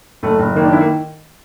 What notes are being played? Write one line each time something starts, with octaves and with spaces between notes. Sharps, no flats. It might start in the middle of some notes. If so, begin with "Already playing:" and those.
F#1 A3
F#1
D#3 A#3
D4
E4
A#3